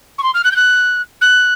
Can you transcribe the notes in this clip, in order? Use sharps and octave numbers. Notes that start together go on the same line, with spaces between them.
C#6
C6
F6
F#6
G6
F#6
F#6